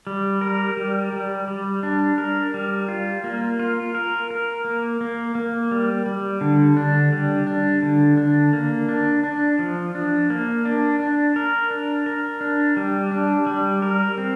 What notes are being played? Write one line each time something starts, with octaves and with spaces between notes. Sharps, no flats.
G3
A#4
G3
G3
G3
D4
A#4
G3
F4
A#3
F4
A#4
A#4
A#3
A#3
A#3
G3
G3
D3
D4
G3
D4
D3
D4
A#3
D4
D4
F3
D4
A#3
D4
D4
A#4
D4
A#4
D4
G3
D4
G3
A#4
C4